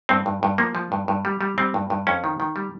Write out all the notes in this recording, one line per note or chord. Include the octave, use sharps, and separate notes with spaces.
G2 C4
G2
G2
F3 A#3
F3
G2
G2
G3
G3
G3 C4
G2
G2
F2 C#4
D#3
D#3
G3